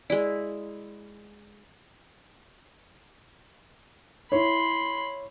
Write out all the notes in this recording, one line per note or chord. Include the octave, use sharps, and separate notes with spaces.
G#3 E4 D5
E4 C#5 B5 C6